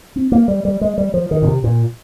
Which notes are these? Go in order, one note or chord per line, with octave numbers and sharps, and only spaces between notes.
C4
A#3
G3
G3
G#3
G3
F3
D#3
A#2
C3
A#2